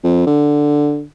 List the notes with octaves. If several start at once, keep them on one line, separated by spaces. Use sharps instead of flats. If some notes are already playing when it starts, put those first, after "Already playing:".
F2
D3